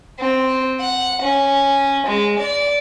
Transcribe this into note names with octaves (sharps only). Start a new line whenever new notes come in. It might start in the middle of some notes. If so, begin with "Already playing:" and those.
C4
F#5
C#4
G#3
D5